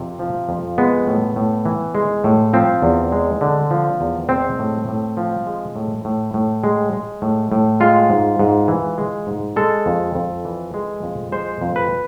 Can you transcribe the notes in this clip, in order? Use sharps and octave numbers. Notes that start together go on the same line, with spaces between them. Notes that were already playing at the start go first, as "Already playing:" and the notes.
Already playing: F2 C3
F3
F2
G#3 B3
A2
A2
E3
G#3
A2
F3 C4
E2
G#3
D3
F3
E2
G#3 C4
A2
A2
F3
G#3
A2
A2
A2
G#3
G#3
A2
A2
G#3 F4
G#2
G#2
E3
G#3
G#2
G#3 A4
F2
F2
E3
G#3
F2
G#3 C5
F2
B4